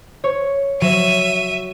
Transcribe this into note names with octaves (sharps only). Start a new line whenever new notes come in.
C#5
F#3 E5 D#7